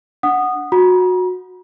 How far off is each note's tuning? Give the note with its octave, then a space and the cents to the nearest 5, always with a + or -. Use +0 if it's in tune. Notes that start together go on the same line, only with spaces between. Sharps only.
D4 +0 F#5 +0 D#6 -20
F#4 -20 A#5 +40